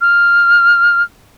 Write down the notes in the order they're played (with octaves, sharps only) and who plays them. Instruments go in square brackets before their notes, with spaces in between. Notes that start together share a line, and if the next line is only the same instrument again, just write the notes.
[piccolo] F6